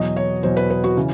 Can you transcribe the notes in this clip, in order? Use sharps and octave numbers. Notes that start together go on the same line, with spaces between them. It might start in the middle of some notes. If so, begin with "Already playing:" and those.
Already playing: E2 B2 F#3 D#5
C#5
E2 B2 F#3 C5
B4
B4
F#4
C#3 E3